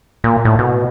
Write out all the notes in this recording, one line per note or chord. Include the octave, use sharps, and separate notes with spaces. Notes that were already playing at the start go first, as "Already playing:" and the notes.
A#2
A2
B2